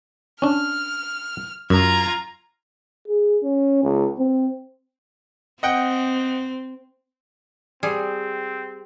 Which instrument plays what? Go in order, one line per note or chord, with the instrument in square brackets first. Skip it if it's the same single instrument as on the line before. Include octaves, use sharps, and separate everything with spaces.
[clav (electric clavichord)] C#4 D4 [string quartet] F6
[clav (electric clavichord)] F#2 [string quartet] F4 A#5 G#6
[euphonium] G#4
C#4
C#2
C4
[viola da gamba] C4 [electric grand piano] D#5 F#5 G5
[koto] G3 G#4 [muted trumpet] C4